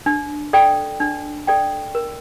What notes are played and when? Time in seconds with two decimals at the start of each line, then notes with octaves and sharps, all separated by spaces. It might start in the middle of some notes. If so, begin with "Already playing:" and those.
0.06 D4
0.53 A4 D5 G5
1.00 D4
1.47 A4 D5 G5
1.95 A#4